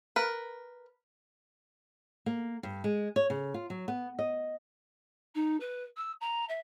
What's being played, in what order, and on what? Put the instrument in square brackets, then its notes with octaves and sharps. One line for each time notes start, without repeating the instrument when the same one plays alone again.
[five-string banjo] A#4 B4
[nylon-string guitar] A#3
G2
G#3
C#5
C#3
F4
F#3
B3
D#5
[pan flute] D#4
B4
E6
A#5
E5